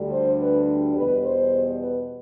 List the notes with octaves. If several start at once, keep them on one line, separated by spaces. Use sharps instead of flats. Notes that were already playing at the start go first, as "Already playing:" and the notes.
Already playing: D2 D3 G3
C5
B4
E2 B2 G3 B4
C5
B4